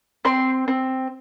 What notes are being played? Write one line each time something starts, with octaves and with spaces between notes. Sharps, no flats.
C4 C6
C4